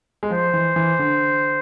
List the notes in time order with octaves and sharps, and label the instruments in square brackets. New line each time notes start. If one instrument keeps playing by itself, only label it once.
[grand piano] G#3
[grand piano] F3 [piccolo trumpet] C5
[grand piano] E3
E3
D3